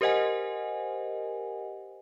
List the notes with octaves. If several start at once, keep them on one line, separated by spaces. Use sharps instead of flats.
G4 A#4 C5 D#5 F#5 G#5